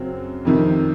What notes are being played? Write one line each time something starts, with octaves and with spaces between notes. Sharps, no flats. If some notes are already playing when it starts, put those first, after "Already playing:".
Already playing: F#2 C#3 F#3 C4
F2 C3 D#3